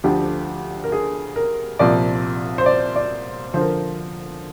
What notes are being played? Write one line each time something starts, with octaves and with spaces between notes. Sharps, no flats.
D2 D3 F3 G4
A#4
G#4
A#4
C2 A#2 F3 D5
C5
D5
D5
D3 F3 C5
A#4